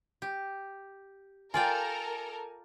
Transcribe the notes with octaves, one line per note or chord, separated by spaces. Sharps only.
G4
F4 A4 A#4 D5 G5 G#5